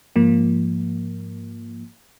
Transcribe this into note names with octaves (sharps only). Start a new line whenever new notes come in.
G#2 F3 A#3